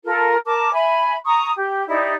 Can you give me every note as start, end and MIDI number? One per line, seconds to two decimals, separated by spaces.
0.05 0.37 65
0.05 0.37 69
0.05 0.37 70
0.45 0.73 70
0.45 0.73 81
0.45 0.73 86
0.73 1.15 76
0.73 1.15 80
0.73 1.15 83
1.25 1.51 82
1.25 1.51 85
1.25 1.51 87
1.56 1.84 67
1.87 2.14 63
1.87 2.14 64
1.87 2.14 67
1.87 2.14 74